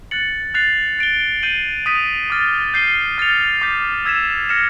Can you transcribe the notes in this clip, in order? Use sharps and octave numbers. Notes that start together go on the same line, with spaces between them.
F#6 A6 C#7 F#7
F#6 A6 C7 F7
A6 D7 G7
G6 C7 D#7 F#7
D#6 G6 B6 D#7
D6 F6 A6
G6 C7 D#7 G7
F6 A6 C#7 F7
D6 G6 B6
E6 G#6 B6 E7
F6 A#6 C#7 E7